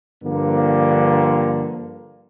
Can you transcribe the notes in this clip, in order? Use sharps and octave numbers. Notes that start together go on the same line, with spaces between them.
G2 D3 F3 A#3